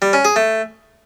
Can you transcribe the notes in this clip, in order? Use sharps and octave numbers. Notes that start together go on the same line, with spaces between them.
G3
C#4
G#4
A3